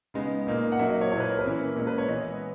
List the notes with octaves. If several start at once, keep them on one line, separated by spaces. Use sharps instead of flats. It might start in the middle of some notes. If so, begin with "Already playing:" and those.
C#3 G#3 B3 D#4
A#2 A#3 D#4
F#5
F#3 A#3 D#4 E5
D#5
C#5
A#2 A#3 E4 C#5
B4
A#4
B4
E3 A#3 C#4 E4
A#2 G#3 C#4 A#4
B4
C#5
E3 G#3 B3 D#5